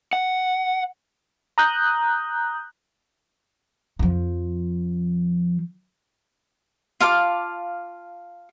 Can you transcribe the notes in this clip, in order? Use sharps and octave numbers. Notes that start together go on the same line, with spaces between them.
F#5
A#5 D#6 F#6 G6
F2 F3
F4 F5 A5 D6